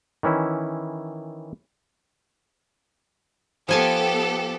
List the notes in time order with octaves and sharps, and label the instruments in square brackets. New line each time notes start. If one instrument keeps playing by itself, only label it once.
[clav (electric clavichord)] D#3 E3 C#4 E4
[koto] F3 G#5 A5 [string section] B3 G4 A4